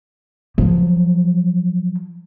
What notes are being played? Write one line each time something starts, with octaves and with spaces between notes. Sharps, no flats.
F3 F#3